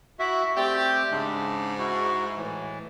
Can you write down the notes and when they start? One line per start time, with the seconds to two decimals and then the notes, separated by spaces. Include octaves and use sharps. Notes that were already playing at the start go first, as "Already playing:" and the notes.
0.19 E4 F#4 E5
0.56 A3 C4 G4 D5
1.11 G#2 C#3 D4
1.79 E4 F#4
2.37 A2 E3